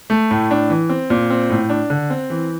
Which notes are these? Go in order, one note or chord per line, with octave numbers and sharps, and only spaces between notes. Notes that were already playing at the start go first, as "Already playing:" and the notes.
A3
A2
D4
E3
C4
A#2
C4
A2
D4
D3
C4
E3